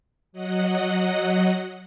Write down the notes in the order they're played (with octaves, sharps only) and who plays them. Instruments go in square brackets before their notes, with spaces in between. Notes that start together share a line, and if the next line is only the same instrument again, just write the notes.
[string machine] F#3 D#5 F#5